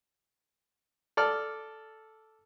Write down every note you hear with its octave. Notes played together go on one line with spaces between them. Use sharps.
A4 D5 F6